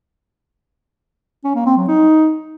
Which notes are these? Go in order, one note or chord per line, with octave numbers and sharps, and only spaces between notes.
C#4
A#3
C4
F#3
D#4